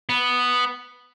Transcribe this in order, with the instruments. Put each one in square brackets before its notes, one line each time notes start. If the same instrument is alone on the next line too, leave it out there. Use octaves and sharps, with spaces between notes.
[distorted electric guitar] B3